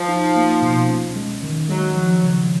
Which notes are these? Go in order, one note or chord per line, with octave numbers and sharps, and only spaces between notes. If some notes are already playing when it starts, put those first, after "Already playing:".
Already playing: F3
D#4
A#3
B2
C#4
G#3
D#3
F#3 G#3
F3
C#3